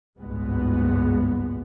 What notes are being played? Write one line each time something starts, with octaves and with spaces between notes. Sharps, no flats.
G#1 C#2 G2 A#2 G#3 B3